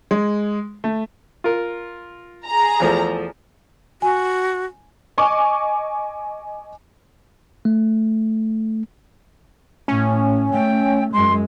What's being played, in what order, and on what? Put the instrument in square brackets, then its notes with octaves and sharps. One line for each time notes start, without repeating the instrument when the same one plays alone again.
[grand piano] G#3
A3
[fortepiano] F4 A#4
[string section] G#4 A#5
[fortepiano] E2 F3 A3
[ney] F#4 [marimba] G#5
[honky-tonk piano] D#5 G#5 C#6 D6
[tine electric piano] A3
[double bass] A2 [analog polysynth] C#4
[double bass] A3 [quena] G5
[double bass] F#2 G#3 [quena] C6